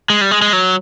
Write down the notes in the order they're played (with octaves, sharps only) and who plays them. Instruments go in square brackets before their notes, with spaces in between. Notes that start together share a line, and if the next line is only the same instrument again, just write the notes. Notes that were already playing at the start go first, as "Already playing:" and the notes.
[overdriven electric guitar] G#3
G3
G#3
G#3
F#3